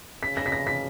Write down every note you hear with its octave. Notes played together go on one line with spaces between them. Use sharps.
C#3 B6
A#6
B6
A#6
B6